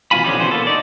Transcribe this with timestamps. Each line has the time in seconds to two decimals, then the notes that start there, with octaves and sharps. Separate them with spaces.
0.11 B2 E3 A#3 F4 G#5 B5
0.24 D3 F3 C#4 D#4 G4
0.39 B2 E3 C#4 C5
0.51 A#3 B3 A4
0.67 D#4 D5